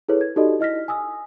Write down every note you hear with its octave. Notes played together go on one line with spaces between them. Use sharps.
E4 G#4 A4 B4 C#5
G#6
D#4 F#4 G4 A4 D5 D#5
E4 D#5 F6 A#6 B6
G#5 D#6 E6